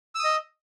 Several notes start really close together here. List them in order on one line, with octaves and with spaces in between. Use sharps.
E6 D#6 D#5